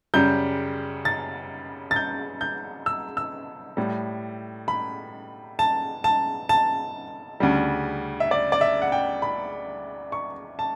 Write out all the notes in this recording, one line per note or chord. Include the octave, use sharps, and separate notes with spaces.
F#2 C#3 G3 G6
A6
A6
G6
G6
E6
E6
A2 G3
B5
A5
A5
A5
D2 C#3 G3
E5
D5
D5
E5
F#5
G5
B5
C#6
A5